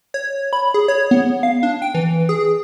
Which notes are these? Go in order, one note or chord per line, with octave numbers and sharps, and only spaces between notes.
C#5
B5
G#4
C#5
B3
F5
D4
G5
E3
G#4